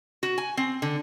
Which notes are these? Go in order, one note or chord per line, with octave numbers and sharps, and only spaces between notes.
F#4
G#5
C4
D3